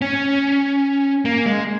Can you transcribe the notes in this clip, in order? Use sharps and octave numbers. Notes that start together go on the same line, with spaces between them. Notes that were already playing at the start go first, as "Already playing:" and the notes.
C#4
A#3
G#3